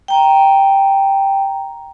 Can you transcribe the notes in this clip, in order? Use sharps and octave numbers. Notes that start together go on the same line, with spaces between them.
G5 A#5